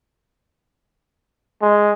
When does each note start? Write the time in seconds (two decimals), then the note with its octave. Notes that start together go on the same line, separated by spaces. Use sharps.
1.62 G#3